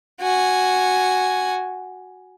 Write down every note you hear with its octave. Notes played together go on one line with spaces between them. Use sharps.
F#4 G#5